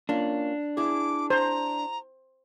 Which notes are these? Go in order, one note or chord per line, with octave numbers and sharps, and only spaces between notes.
A#3 C#4 D4 F4
E4 G#4 D6
C5 A#5